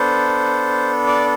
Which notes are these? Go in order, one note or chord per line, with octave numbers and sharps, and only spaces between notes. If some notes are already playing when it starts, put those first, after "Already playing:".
Already playing: B3 D4 A4 C5
D5